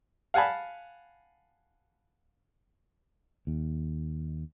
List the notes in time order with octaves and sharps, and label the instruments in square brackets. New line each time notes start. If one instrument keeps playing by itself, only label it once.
[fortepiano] F5 F#5 G#5 A5 B5
[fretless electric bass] D#2